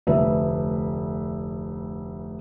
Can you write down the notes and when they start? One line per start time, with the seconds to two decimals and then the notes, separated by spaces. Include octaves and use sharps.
0.07 F1 D2 B4 E5